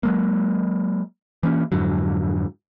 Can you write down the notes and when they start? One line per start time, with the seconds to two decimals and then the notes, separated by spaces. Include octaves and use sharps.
0.03 F#3 G#3 A#3
1.43 E3 A#3 C#4
1.72 F2 G#2 D3 F#3